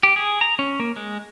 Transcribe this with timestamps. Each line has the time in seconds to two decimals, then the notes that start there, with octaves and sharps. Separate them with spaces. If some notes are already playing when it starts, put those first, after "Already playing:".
0.03 G4
0.16 G#4
0.41 A#5
0.59 C#4
0.80 A#3
0.96 G#3